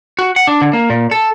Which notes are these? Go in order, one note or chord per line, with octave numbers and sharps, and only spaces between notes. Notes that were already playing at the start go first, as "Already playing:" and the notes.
F#4
F#5
D4
D3
A#3
A#2
A4